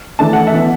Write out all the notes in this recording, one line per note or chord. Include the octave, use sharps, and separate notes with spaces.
E3 A3 D4 A5
F#5
E5
E3 B3 D4